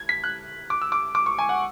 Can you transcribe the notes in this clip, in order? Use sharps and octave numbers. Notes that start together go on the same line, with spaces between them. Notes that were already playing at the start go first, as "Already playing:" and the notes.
Already playing: G#6
B6
F#6
D6
E6
D6
D6
C#6
G#5
F#5